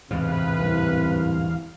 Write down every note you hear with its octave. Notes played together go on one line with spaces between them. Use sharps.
D1 E2 G#2 C3 B4 F5
C2